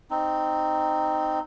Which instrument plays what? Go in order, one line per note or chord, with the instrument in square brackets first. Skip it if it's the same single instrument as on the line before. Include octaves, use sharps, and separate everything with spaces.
[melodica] C4 D#4